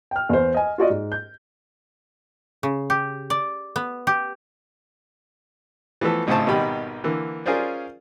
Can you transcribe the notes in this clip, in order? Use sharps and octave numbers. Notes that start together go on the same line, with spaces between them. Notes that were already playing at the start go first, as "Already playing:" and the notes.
G5 F6
E2 C5
D#5 G#5
F4 F#4 D5 D#5
G#2
G6
C#3
G4
D5
B3
G4
E3 F3 A3 B3 A4
G#1 A2 C#3 C5 A5
G#1 B2 D#3 G3 G4 B5
D3 E3 A#3
C#4 F4 G#4 A#4 C5 D5